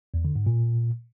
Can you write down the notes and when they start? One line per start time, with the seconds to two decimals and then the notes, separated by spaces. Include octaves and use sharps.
0.14 E2
0.25 D3
0.36 G#2
0.46 A#2